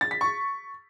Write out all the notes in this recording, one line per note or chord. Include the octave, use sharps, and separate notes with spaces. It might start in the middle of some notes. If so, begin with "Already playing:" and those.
A6
B6
C#6